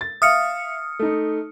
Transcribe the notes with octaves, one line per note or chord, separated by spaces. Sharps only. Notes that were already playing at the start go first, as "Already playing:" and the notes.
A6
E5 F5 D#6 F6 C#7
A3 D#4